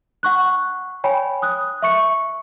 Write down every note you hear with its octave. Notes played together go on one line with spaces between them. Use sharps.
F#5 C#6 F#6
C#5 G5 G#5 B5
D#6 F#6
E5 C#6 C#7